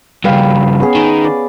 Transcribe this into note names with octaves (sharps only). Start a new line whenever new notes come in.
G2 C#3 B4 F5 G5
B3 C#4 G#4
D#3
D5